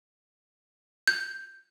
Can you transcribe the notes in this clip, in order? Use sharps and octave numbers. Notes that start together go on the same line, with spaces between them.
G6